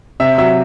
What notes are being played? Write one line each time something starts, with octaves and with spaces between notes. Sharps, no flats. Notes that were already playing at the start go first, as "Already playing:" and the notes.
C3 E5
F#3 E5